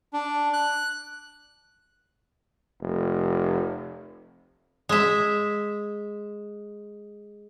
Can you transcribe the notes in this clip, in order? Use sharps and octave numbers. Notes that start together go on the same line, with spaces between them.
D4
F#6
F1
G#3 E5